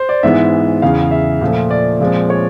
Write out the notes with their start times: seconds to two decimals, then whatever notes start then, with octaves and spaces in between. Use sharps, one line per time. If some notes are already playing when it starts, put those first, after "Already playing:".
Already playing: C5
0.09 D5
0.23 G#2 E3 G#3 B3 E5
0.82 E2 C#3 E3 F5
1.11 E5
1.41 A#2 F3 A3
1.71 D5
2.00 A#2 F3 G#3 C4
2.30 C#5